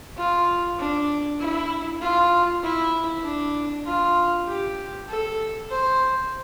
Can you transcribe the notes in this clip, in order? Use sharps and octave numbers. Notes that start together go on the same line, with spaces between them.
F4
D4
E4
F4
E4
D4
F4
G4
A4
C5